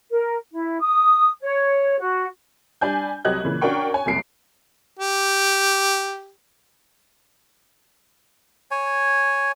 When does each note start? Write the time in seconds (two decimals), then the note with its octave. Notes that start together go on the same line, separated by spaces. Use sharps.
0.10 A#4
0.52 E4
0.80 D#6
1.41 C#5
1.98 F#4
2.81 G3 D4 G#5 G6
3.25 C2 F#3 G4 D#5 F#6 G#6
3.43 A#2 C#3 E3
3.61 C#4 D4 F#4 A#4 G5 C#6
3.94 C#5 G#5
4.06 F#1 C2 F#2 C7 D7
5.00 G4
8.71 C#5 G#5